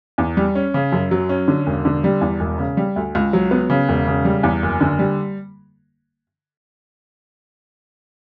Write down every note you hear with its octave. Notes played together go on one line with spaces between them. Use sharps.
E2
G3
C#4
C#3
F#2
F#3
C#4
D3
E1
D3
G3
E2
E1
C#3
G3
D2
C#2
F#3
B3
C#3
E1
C#3
G3
E2
F#1
D3
G3